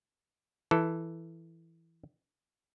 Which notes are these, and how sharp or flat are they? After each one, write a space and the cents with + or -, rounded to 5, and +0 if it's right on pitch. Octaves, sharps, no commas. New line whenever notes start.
E3 +0 A4 +5